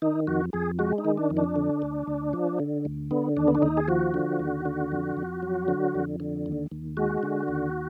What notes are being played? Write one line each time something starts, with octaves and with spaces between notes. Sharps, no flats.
D#3 D#4
F2 F#4
F2 G#4
G#3 F#4
D#4
D#3
D4
F2
D4
D3
D2
D2
F3
D3
D2
D3 B3
D#2 D4
B3
D4
D#2 D#4
G#4
F3 F#4
D3
D#2
D3
F2
F2
F#3
D3
F2
D3
D#2
D#2
G#3 F#4
D3
D#2